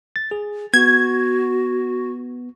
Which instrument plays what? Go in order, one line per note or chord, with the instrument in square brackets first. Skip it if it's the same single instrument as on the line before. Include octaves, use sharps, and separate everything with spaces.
[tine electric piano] A6
G#4
[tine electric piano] B3 [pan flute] F#4 [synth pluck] G#6